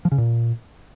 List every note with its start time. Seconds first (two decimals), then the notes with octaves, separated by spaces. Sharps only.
0.05 F3
0.11 C#3
0.18 A#2